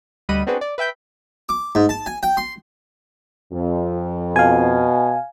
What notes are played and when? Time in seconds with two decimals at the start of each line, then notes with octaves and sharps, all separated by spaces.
0.29 D2 G3 D#5 F#5 B5 D#7
0.47 B3 C4 D4 F#4 G#4 B4
0.61 D5
0.78 B4 E5 G5 G6 B6
1.49 D6
1.75 G#2
1.89 A5
2.06 G#5
2.23 G5
2.37 C6
3.53 F2
4.36 B2 F5 G#5